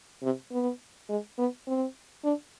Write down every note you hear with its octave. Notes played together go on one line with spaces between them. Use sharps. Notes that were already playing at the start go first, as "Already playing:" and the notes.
C3
B3
G#3
B3
C4
D4